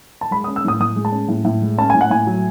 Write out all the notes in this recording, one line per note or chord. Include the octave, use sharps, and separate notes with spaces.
A5
G#3 B5
D#6
C#4
E6
A2 D#6
A2 D#6
G#3
A5
C#4
A2
A2
G#3
C#4 A5
A2 G#5
F#5
A2 G#5
F#3